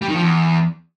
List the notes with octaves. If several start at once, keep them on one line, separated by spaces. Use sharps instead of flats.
G3
D#3
F3
E2